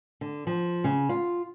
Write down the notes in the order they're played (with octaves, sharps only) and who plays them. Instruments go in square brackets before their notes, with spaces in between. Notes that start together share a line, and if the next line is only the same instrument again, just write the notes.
[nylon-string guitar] D3
F3
C#3
F4